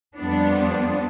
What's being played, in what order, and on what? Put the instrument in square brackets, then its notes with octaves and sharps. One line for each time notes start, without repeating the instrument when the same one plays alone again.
[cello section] F2 G3 B3 D4